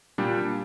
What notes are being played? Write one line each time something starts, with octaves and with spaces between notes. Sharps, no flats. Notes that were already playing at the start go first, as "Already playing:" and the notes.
A#2 G3 D4